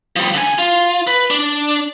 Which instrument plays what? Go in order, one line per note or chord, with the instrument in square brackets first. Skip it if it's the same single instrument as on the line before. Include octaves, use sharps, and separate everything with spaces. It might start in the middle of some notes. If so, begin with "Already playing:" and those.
[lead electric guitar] F3 G3
D3 G#5
F4
B4
D4